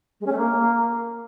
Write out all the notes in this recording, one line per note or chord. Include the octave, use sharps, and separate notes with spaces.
G#3
C#4
A3
A#3